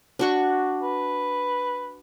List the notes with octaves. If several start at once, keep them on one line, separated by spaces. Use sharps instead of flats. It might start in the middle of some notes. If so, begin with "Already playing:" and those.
D4 F#4 C#6
B4